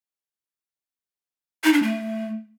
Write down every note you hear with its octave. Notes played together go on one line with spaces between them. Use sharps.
D#4
D4
A3